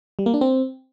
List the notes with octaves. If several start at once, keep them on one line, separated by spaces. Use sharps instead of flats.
G3
A#3
D4
C4